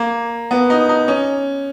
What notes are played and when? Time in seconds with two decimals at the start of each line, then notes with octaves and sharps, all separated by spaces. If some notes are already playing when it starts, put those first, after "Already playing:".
Already playing: A#3
0.51 B3
0.70 D#4
0.89 D#4
1.08 C#4